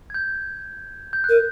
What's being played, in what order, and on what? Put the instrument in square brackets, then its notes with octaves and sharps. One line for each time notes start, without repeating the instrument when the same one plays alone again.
[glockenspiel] G#6
G6
G6
F#6
[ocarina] A#4